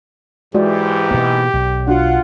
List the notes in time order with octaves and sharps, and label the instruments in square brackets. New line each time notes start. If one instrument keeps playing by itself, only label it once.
[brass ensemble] G#2 E3 [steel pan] G#3 F#4 D5 [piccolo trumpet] G4
[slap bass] B2 A#3
B1
[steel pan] D4 F#4 [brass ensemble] F4 F#5